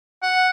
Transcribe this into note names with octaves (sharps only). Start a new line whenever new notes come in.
F#5